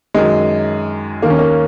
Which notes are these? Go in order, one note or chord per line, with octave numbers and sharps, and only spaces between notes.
F#2 D#3 G#3
D#2 D#3 A#3
C#4
A#3